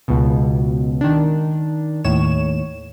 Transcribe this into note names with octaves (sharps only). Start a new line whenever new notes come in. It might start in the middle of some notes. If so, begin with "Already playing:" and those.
C#2 B2
D#3 D4
D#2 A2 C#5 E7